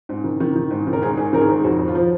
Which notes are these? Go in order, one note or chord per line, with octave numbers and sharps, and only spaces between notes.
G#2
D#3
D#3
D#3
G#2
D#3
A#4
G#2 G#4
G#2 G#4
D#3 A#4
G#4
G#2
F2 F#4
F2
F4
F3